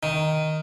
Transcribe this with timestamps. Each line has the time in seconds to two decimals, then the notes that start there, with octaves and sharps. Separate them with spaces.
0.03 D#3